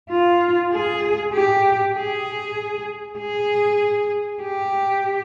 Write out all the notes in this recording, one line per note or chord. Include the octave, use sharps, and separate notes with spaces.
F4
G#4
G4
G#4
G#4
G4